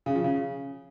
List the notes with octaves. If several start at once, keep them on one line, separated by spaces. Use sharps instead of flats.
C#3
F3
C#3